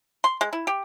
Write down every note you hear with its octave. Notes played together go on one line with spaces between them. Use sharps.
C6
G#3
E4
G4